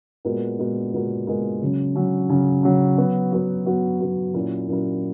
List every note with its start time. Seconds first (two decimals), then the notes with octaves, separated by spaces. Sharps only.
0.25 A#2 G#3 B3 F#4 A#4
0.59 A#2 G#3 B3 F#4 A#4
0.94 A#2 G#3 B3 F#4 A#4
1.27 A#2 G#3 B3 F#4 A#4
1.62 C#3 F#3 C#4
1.96 C#3 F#3 C#4
2.29 C#3 F#3 C#4
2.63 C#3 F#3 C#4
2.98 F#3 B3 F#4
3.33 F#3 B3 F#4
3.66 F#3 B3 F#4
4.01 F#3 B3 F#4
4.34 A#2 F#3 C#4 E4 A#4
4.68 A#2 F#3 C#4 E4 A#4